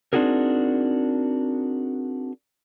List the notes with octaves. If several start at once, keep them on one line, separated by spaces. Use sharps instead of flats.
C4 D4 D#4 F#4 G#4 A#4